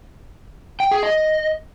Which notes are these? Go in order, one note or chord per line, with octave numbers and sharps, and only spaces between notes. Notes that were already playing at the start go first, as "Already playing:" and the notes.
G5
G#4
D#5